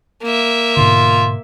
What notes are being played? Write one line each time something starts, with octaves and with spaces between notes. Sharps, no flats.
A#3 E5
G#2 B2 D3 F4